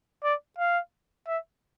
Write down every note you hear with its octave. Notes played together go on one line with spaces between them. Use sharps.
D5
F5
E5